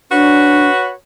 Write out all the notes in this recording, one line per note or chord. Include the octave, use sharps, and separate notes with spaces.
D4 F#4 B4 C#5